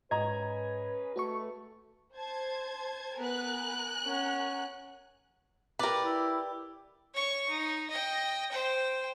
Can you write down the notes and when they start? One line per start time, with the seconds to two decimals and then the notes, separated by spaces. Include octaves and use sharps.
0.11 G#2 C#4 G#4 B4 D#5 A#5 G#6
1.16 A3 F#4 B4 C#6
2.16 C5 A5 G#6
3.17 B3 A#4 B4 G#5 F#6
4.04 C#4 F#5
5.79 G4 A#4 B4 D5
6.03 E4
7.14 C#5 C#6
7.49 D#4
7.90 D#5 G5
8.51 C5 G5